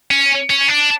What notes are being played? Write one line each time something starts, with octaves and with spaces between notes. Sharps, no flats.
C#4
C#4
D4